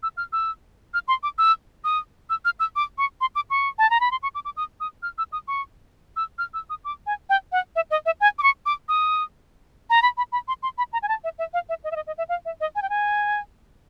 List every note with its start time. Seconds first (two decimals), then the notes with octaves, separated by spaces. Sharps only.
0.03 E6
0.17 F6
0.32 E6
0.94 F6
1.08 C6
1.23 D6
1.38 E6
1.84 D#6
2.30 E6
2.45 F6
2.59 E6
2.76 D6
2.98 C#6
3.21 C6
3.35 D6
3.50 C#6
3.78 A5
3.90 A#5
4.00 B5
4.11 C6
4.23 C#6
4.35 D6
4.45 D6
4.56 D#6
4.80 D#6
5.03 F6
5.18 E6
5.32 D#6
5.48 C#6
6.16 E6
6.38 F6
6.54 E6
6.70 D#6
6.84 D6
7.06 G#5
7.29 G5
7.52 F#5
7.76 E5
7.90 D#5
8.06 E5
8.20 G#5
8.38 D6
8.43 C#6
8.66 D6
8.88 D#6
9.90 A#5
10.02 B5
10.17 B5
10.32 B5
10.48 C6
10.63 C6
10.78 B5
10.93 A#5
11.03 G#5
11.08 A5
11.24 E5
11.38 E5
11.53 F5
11.69 E5
11.84 D#5
11.91 E5
11.96 D#5
12.07 D#5
12.18 E5
12.29 F5
12.45 E5
12.60 D#5
12.75 G#5
12.82 G5
12.89 G#5